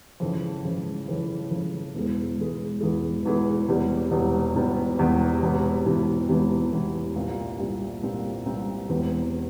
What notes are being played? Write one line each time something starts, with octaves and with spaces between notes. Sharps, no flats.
F2 C#3 E3
F2 C#3 E3
F2 C#3 E3
F2 C#3 E3
E1 E2 E3 G#3
E1 E2 E3 G#3
E1 E2 E3 G#3
E1 E2 E3 G#3
E1 E2 C3 G3
E1 E2 C3 G3
E1 E2 C3 G3
E1 E2 C3 G3
E1 E2 C3 E3
E1 E2 C3 E3
E1 E2 C3 E3
E1 E2 C3 E3
C2 A#2 G3 C4
C2 A#2 G3 C4
C2 A#2 G3 C4
C2 A#2 G3 C4
E1 E2 E3 G3 C4